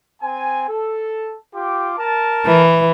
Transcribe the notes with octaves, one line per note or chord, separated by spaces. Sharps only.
C4 G#5
A4
F4 G4 D6
A#4 A5
E3